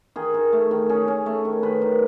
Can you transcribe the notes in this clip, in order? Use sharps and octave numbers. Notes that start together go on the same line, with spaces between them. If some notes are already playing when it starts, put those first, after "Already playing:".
D#3 G#4
D#3
A3
D#3
C#4 G#4
C#4
A3
D#3
D#3 B4
D#3